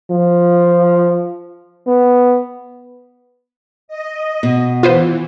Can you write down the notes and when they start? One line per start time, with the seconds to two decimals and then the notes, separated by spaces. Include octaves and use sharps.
0.11 F3
1.87 B3
3.88 D#5
4.43 B2
4.83 E3 F4 B4 C5